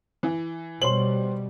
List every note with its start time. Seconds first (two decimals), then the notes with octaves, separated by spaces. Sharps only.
0.23 E3
0.82 B2 G3 C5 C#5 C6 F#7